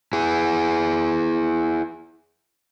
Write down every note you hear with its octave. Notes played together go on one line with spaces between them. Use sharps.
E4 G#4